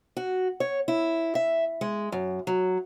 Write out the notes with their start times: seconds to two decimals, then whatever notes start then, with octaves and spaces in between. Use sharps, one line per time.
0.17 F#4
0.60 C#5
0.88 E4
1.35 E5
1.81 G#3
2.12 F#2
2.47 F#3